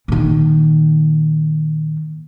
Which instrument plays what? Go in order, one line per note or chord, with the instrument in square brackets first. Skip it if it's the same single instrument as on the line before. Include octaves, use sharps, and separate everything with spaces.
[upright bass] A#2 D#3